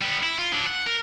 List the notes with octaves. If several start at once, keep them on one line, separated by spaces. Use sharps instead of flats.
G3 B3
E4
F4
F#3 D4
F#5
A#4